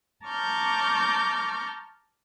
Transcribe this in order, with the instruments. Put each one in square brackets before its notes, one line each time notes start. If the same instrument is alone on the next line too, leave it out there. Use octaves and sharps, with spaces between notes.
[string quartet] A5 A#5 C#6 D6 F6 G6